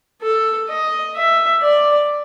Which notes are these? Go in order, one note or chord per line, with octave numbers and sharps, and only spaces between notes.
A4
D#5
E5
D5